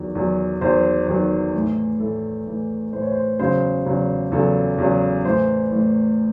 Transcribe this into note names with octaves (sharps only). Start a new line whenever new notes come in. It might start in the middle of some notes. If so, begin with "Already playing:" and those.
Already playing: E2 D#3 F#3
E2 D#3 F#3
E2 D#3 F#3 C5
E2 D#3 F#3
A2 E3
A2 E3 A4
A2 E3
A2 E3 C5
C#5
C5
E2 C#3 F#3 C5
E2 C#3 F#3
E2 C#3 F#3 A4
E2 C#3 F#3
A2 E3 C5
A2 E3